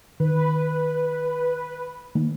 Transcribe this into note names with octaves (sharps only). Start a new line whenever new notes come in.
D#3 B4
D#3 A3 A#3